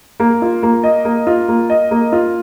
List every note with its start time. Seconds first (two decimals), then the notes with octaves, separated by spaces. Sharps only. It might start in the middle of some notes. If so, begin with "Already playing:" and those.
0.20 A#3
0.42 F4
0.63 A#3
0.84 D#5
1.05 A#3
1.27 F4
1.48 A#3
1.70 D#5
1.91 A#3
2.12 F4